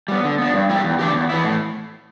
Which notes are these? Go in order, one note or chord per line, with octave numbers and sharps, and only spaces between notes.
G3 B3
D3
B3 D4
G2
G3 E4 G4
E2
D3 A3 D4 G4
E2
E3 B3 E4
A2